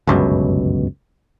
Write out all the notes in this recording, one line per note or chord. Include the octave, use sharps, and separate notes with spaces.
G1 C#2 F#2 B2